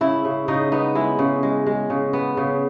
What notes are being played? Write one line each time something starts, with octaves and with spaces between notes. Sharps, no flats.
C#3 E4
C#3
C#3 D#4
B3 D#4
G#3 E4
C#3
G#3
G#3
C#3
B3
C#3